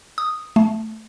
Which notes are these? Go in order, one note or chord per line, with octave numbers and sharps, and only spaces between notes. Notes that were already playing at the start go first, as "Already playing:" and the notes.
D#6
A3